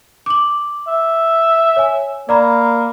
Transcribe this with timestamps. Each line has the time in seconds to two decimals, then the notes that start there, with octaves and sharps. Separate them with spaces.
0.26 D6 F#7
0.88 E5
1.76 C#5 G#5
2.29 A#3 D5 A#5 B5